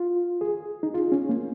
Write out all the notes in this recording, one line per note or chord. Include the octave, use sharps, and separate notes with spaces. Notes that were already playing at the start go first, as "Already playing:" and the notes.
Already playing: F4
G#4
D#4
F4
C#4
A#3